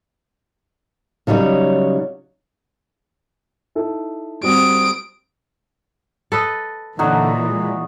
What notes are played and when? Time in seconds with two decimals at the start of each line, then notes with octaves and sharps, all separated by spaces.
1.27 C#3 F#3 G3 D#4 C#5
3.75 D#4 E4 A4
4.43 G3 C4 F#4 D#6 D7
6.32 A4 B4 D#5
6.99 A#2 D3 E3 F#3 D#4 F#4
7.48 G#3